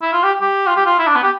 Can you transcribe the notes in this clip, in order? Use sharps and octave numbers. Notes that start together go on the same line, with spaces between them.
E4
F4
G4
G4
F4
G4
F4
E4
D4
B3
G4